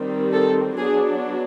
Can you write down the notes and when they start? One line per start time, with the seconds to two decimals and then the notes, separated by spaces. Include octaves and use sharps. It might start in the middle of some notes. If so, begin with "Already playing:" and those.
Already playing: D#3 G3 C4
0.32 A4
0.77 F#3 B3 D4 G#4